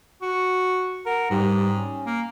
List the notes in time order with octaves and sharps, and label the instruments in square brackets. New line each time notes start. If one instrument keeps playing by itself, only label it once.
[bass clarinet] F#4
[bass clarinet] A#4 [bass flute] F#5
[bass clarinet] G#2 [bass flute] G3
[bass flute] C#4
[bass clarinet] A#3